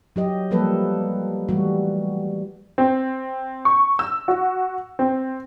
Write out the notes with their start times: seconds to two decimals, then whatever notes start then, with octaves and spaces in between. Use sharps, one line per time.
0.16 F#3 G4 D#5
0.51 F3 G3 A#3 A4 B4
1.49 E3 G3 A3 F#4
2.78 C4
3.65 C#6
3.99 E6
4.28 F#4
4.99 C4